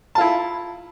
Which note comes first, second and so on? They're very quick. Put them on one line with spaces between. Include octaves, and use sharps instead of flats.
A5 F4 E4